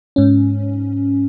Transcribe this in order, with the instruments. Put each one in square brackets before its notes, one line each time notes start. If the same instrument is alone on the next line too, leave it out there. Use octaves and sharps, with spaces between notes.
[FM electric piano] G#2 C#4